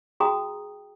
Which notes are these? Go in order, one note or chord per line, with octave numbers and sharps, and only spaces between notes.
F#4 G#4 G5 A#5 D#6